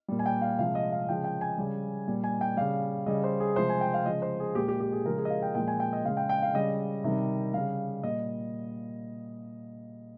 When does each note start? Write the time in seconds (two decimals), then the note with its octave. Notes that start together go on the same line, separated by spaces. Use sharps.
0.08 A#2 G3
0.19 G#5
0.26 G5
0.42 F5
0.59 C3 F3 G#3 F5
0.75 D#5
0.92 F5
1.09 C#3 F3 G#3 G5
1.24 G5
1.41 G#5
1.58 C#3 G3
2.08 A#2 G3
2.24 G#5
2.41 G5
2.57 C#3 G3 F5
3.06 C#3 G3 D#5
3.24 C5
3.40 G#4
3.56 C3 F3 G#3 C5
3.69 G#5
3.81 G5
3.94 F5
4.06 C#3 F3 G#3 D#5
4.22 C5
4.40 G#4
4.55 A#2 G#3 G4
4.68 G4
4.80 G4
4.92 G#4
5.05 C#3 F3 G#3 A#4
5.18 G#4
5.25 D#5
5.30 F5
5.43 G5
5.55 A#2 F3 G#3 G5
5.68 G#5
5.80 G5
5.93 D#5
6.05 C#3 G#3 F5
6.17 G5
6.29 G5
6.42 F5
6.54 C#3 G3 D#5
7.04 C3 D#3 G3
7.54 C#3 G3 F5
8.03 A#2 G3 D#5